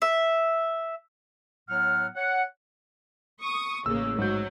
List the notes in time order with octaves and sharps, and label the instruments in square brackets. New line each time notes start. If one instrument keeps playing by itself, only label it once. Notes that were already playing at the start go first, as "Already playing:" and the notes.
[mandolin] E5
[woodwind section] A2 F#3 B3 F#5 F6
C#5 F#5
[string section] C#6 D#6
[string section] A1 C#3 A#3 [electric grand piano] E6
[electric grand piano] G#2 G6 [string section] F#3